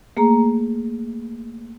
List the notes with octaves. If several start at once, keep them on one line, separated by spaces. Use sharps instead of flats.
A3 A#3 G#4 A#5